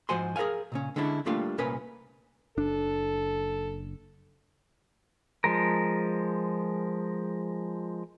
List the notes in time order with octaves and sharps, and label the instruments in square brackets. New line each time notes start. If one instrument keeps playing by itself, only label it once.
[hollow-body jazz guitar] G#2 F3 F#4 C5 G#5 C6
G#4 A#4 D5 F5 G#5
A#2 C#3 C#4
D3 G#3 C#4 D4 E4
G3 A3 A#3 D4 F4 F5
C2 A#2 C#4 A#4 B4 B5
[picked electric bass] F#1 D4 [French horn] A4
[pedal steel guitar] F3 G#3 A#4